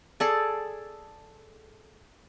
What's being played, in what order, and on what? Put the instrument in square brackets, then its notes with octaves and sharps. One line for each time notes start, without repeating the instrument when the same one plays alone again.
[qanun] G#4 A4 D5